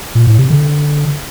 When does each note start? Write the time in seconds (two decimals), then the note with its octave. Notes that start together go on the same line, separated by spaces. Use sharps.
0.15 A#2
0.27 A2
0.39 C3
0.50 D3